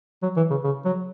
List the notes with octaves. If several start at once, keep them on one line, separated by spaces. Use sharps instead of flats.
F#3
E3
C#3
C#3
F#3